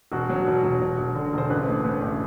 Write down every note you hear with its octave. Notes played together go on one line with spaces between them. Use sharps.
E1 F#4
F#3
E1
E1
E1
E1
D3
E1 C5
A1 B4
A2
A2 B4
A1